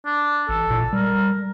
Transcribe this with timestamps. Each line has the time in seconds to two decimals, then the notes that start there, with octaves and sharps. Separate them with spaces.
0.06 D4
0.49 A1 A4
0.70 A#2
0.93 G3 A#4